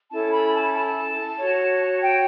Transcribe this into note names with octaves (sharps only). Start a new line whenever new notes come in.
C#4 E4 A4 A5
B5
A5
A5
F#4 C#5
G5